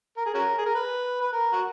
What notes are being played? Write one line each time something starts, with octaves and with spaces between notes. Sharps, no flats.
A#4
G#4
C#4 F#4 A#4
G#4
A#4
B4
B4
A#4
F#4